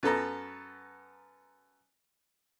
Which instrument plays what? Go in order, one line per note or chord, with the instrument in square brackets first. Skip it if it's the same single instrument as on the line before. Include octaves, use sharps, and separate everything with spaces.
[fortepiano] F#2 B3 A4 A#5